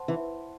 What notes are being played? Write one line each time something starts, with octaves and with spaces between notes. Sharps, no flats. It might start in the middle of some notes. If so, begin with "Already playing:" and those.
Already playing: C5 F#5 A5 C6
E3